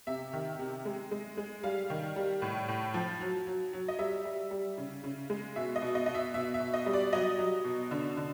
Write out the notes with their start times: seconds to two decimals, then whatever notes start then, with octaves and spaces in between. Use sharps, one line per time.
0.07 C3 E5
0.33 D#3
0.59 C3
0.85 G#3
1.11 G#3
1.37 G#3
1.63 G3 F5
1.90 D#3
2.16 G3
2.42 A2
2.68 A2
2.94 F3
3.21 F#3
3.47 F#3
3.73 F#3
3.88 D#5
3.99 G3 E5
4.25 G3
4.51 G3
4.78 C#3
5.03 C#3
5.30 G#3
5.56 B2 E5
5.76 D#5
5.82 B2
5.95 D#5
6.06 B2 D#5
6.15 E5
6.34 B2 E5
6.54 E5
6.60 B2
6.74 D#5
6.86 G3
6.93 D5
7.13 F#3 D#5
7.38 F#3
7.64 B2
7.91 D3
8.17 D3